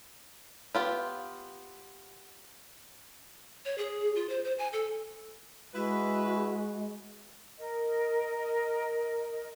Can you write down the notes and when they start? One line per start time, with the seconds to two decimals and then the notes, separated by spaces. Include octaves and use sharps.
0.75 B3 F4 G4
3.65 C#5
3.78 G#4
4.16 F4
4.29 C5
4.45 C5
4.59 G#5
4.73 A4
5.74 G#3 E4 F#4 B4
7.58 A#4 D#5